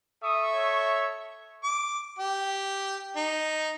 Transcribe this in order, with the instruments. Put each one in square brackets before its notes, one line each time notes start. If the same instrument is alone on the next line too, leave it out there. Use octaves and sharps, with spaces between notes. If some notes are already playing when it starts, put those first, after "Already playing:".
[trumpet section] A4 E5 C#6 [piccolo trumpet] D#6
[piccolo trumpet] C#5
[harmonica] D6
G4
D#4